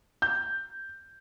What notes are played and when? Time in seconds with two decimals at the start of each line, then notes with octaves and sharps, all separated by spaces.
0.22 G6